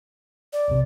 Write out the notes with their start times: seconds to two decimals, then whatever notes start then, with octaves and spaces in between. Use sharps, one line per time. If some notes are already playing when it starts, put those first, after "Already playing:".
0.53 D5
0.68 B1 E2 C3